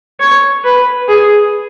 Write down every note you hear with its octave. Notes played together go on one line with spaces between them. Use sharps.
C#5
B4
G#4